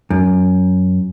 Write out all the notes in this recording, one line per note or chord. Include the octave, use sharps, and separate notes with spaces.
F#2